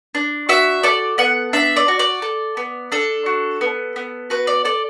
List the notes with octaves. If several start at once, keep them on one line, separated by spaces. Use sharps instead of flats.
D4
F#4 E5
A4 D5
B3 F#5
D4 E5
D5
F#4
D5
A4
B3
D4 A4
F#4
B3
B3
F#4 B4
D5
A4 D5